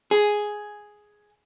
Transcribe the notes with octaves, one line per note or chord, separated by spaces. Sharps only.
G#4